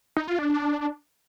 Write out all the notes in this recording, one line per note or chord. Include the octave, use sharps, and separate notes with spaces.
D#4
F4
D4
D4